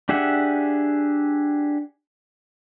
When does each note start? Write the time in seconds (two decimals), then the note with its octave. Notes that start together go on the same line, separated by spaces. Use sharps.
0.09 D4 G4 G#4 E5 F#5